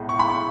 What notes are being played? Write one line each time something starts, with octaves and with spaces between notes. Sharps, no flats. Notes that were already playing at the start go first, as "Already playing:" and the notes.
Already playing: B1 A2 G#3
C#6
B5
C#6